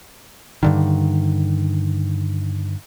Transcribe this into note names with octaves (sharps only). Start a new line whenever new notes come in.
G2 D3 D#3